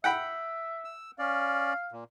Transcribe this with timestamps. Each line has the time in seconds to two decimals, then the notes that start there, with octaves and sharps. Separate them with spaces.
0.04 E5 F#5 G5 B5
0.85 E6
1.19 C#4 D5 F5
1.92 A#2